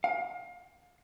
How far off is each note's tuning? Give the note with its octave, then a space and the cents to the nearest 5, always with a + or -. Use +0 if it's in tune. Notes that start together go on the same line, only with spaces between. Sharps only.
F5 +30